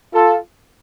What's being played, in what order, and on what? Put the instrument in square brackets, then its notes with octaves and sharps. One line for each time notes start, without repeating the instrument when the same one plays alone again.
[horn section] F4 A4